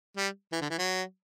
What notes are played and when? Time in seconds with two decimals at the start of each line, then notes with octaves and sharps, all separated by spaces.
0.17 G3
0.52 E3
0.61 D3
0.70 E3
0.78 F#3